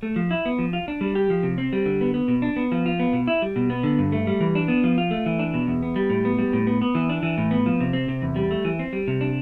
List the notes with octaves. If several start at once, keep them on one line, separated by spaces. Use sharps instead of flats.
A3
F3
E4
B3
F3
F4
D4
G3
G4
F3
C3
C4
G3
D3
B3
B3
B2
D4
B3
F3
F4
B3
B2
E4
G3
B2
B3
D3
G2
A3
G3
E3
D4
B3
F3
F4
A3
E3
D4
B2
E2
B3
G3
A2
B3
G3
A2
B3
B3
E3
D4
E3
A2
B3
F3
C3
C4
C3
E2
G3
A3
E3
C4
G3
C3
D4